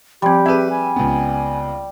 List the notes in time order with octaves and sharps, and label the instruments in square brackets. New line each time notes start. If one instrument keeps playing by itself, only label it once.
[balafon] F3 C4 [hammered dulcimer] G3 [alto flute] G4
[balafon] C4 G#4 [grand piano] B4 E5
[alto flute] G#5
[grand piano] C#2 B3